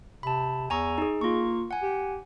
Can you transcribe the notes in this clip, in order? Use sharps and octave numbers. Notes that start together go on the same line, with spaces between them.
C3 A5 B5
E2 G#5 A#5 C#6
D#4 G#4
A#3 F4 C#6
F#5 G#5
G4